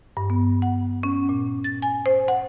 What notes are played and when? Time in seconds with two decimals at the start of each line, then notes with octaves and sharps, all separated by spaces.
0.17 G2
0.30 B3
0.62 F#5
1.03 C#4
1.29 A#2
1.64 A6
1.82 G#5
2.06 C5
2.28 F#5